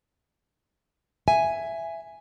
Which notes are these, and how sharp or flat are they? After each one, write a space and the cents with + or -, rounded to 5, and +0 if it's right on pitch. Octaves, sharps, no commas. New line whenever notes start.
E5 +10 G#5 +0